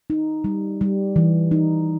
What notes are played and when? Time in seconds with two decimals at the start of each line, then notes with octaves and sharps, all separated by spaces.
0.10 D#4
0.44 G3
0.81 G3
1.16 E3
1.51 D#4